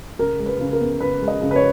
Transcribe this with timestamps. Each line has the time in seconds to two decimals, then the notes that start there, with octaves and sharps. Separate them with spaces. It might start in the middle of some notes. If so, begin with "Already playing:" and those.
0.19 C#3 A#4
0.39 G#3
0.46 B4
0.59 C#3
0.73 A#4
0.80 B3
1.00 C#3 B4
1.22 G#3
1.28 D#5
1.41 C#3
1.51 B4
1.56 C#5